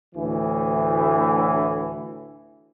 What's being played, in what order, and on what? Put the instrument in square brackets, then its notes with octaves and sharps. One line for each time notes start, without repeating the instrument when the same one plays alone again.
[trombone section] D2 A2 E3